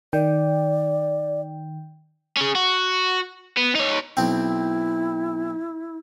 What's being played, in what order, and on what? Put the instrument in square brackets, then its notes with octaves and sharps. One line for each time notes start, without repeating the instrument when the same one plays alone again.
[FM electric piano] D#3 G5 [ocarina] D5
[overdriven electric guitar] C#4 G#4
F#4
B3
D#4 C#5
[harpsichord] B1 C4 [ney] E4